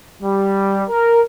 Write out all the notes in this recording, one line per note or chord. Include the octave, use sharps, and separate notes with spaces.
G3
A#4